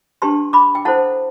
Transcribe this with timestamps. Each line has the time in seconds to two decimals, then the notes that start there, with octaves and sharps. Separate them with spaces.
0.22 D4 G4 B4 A5 C6
0.53 B5 D6
0.75 G5
0.85 E4 A4 C5 F#5 A5